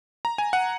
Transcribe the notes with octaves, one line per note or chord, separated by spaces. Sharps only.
A#5
G#5
F#5